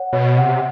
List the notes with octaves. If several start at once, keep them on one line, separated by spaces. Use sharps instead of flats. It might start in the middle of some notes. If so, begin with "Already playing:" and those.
Already playing: C#5 F#5
B2 C#5
C3 F#5